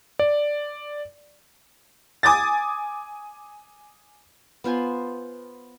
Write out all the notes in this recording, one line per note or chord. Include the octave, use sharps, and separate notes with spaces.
D5
G#5 D6 D#6 A6
B3 F4 C5 G#5